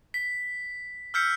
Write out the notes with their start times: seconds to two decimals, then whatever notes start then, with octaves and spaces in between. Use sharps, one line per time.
0.14 B6
1.14 E6 F6 G6 B6 C#7